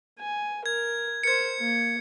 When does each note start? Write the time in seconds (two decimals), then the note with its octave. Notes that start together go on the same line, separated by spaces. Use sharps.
0.20 G#5
0.66 A#4 G#6
1.23 A#4 C5 G#6 C#7
1.60 A#3